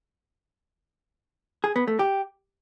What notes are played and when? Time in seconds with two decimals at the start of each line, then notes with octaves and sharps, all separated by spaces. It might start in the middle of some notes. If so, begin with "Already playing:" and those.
1.64 G#4
1.76 B3
1.88 A3
1.99 G4